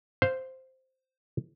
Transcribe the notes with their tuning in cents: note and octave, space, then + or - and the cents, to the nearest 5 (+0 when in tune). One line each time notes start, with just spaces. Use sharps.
C5 +0 F5 +0